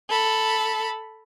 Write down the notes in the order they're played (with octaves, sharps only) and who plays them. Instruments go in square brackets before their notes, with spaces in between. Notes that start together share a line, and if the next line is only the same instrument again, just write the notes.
[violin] A4 B5